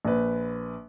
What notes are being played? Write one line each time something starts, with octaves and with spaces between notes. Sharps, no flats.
A#1 B4